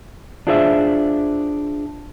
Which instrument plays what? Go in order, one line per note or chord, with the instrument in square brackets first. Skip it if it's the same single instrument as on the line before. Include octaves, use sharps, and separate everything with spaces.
[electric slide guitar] D4 F4 G#4 C5 D5 E5